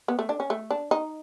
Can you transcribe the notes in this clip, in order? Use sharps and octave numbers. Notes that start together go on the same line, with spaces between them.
B3
A3
D4
C#4
A3
D4
D#4